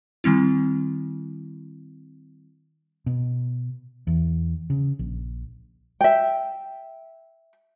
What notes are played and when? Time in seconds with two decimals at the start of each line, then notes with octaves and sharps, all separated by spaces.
0.24 D#3 G3 C4 E4
3.06 B2
4.07 E2
4.70 C#3
4.99 A#1
6.01 E5 G5